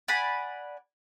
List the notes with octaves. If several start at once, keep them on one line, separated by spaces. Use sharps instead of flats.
D5 F#5 G#5 B5